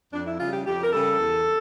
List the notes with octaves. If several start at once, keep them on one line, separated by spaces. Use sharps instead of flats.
F2 D4
E4
C#3 G3 F4
G4
F2 G4
A#4
C#3 G3 A4
E2